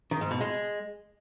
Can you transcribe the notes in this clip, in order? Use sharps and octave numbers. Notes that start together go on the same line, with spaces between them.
D#3
G#2
B2
G#3